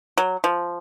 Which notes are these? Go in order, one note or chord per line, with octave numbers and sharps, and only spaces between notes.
F#3
F3